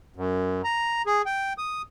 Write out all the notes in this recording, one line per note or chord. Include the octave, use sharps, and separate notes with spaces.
F#2
A#5
G#4
G5
D#6